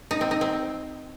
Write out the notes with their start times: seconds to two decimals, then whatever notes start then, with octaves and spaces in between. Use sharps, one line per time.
0.11 D#4
0.21 C4
0.31 D#4
0.41 C4